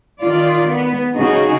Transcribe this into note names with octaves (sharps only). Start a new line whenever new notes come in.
D#3 F4 D5
B3
C#3 D#4 F#4 G#4